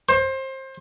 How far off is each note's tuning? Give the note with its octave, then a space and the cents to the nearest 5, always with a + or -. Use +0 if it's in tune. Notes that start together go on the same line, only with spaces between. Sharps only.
C5 +25